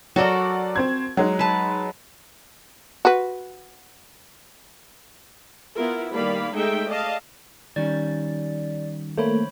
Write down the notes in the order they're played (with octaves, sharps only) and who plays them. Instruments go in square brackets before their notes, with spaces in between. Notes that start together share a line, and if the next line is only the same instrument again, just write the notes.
[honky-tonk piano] F#3 D5 [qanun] F#4 A4 A#4
[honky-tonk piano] C4 C5 G#6
F#3 G#3 D#4
[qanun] B4 A5
[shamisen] F#4 B4
[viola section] B3 E4 F4 A#4
D#3 G3 A#3 D5 F5 B5
G#3 A3 D#4 G#4 E5 G5
D5 D#5 F5 A5
[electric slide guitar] D#3 G3 C#4 [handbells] D5 A6
[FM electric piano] A3 A#3 [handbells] C5 C#5 B5